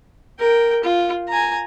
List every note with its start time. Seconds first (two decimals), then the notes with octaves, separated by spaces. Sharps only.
0.39 A#4 G5
0.84 F4
1.29 G#5 A#5